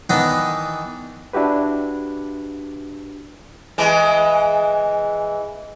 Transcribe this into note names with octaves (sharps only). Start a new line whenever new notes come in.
D#3 E3 B3 D4 D#5 F#5
D4 E4 F#4 G4 B4
E3 G#3